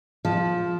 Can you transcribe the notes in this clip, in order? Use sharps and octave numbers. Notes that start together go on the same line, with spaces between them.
F3